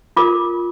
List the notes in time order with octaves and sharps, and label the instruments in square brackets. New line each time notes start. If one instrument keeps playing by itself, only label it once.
[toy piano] F4 A#4 D6